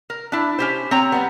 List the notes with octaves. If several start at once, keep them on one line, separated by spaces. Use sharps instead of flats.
A#4
D4 E4
C#4 G4 C5
C4 C#5 A#5
G3 B3